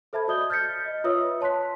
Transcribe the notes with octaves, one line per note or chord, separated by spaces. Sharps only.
A4 C5 E5 A5 B5 G#6
F#4 D5 D#5 D#6 G6 G7
F6 G6 A6 B6 C#7
D#5
F4 B4 C#5 E5 D#6 E6
C#5 A5 C6 F#6 B6